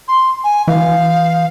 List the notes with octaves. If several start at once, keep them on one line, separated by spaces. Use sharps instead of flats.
C6
G#5
E3 F5